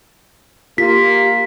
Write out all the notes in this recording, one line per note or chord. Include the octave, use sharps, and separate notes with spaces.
A#3 F4 G4 B6